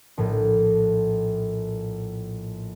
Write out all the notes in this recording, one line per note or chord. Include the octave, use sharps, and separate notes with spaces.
A#1 A2